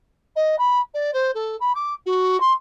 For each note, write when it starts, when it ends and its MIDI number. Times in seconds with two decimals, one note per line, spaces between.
0.36 0.56 75
0.58 0.80 83
0.94 1.10 74
1.13 1.31 72
1.34 1.56 69
1.60 1.72 83
1.75 1.93 86
2.06 2.40 66
2.40 2.52 84